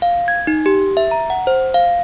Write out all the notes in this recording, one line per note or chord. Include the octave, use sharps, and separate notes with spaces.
F5
G#6
D#4
G4
E5
A#5
F#5
C5
F5